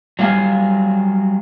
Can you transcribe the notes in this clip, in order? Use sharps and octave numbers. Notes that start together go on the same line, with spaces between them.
F#3 G3 F5 G#5